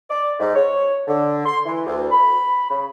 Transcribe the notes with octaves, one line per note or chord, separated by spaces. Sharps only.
D5
G#2
C#5
D3
C6
E3
D2
B5
C#3